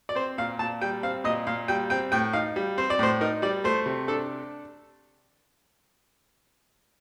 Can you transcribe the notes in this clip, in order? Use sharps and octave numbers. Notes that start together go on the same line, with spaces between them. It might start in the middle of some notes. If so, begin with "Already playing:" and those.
D5
C4 C5
A#2 F5
A#2 A5
G3 G5
C4 F5
A#2 D#5
A#2 F5
G3 G5
C4 G5
A2 G5
D#4 F5
G3
C4 C5
D5
A2 C5
D#4 A#4
G3 D5
A3 C5
C3
D4 A4